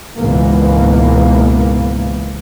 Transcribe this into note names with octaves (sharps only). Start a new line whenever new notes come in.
C#2 G#2 B2 E3 A#3 B3